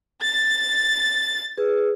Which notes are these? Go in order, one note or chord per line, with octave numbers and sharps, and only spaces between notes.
A6
G#4 B4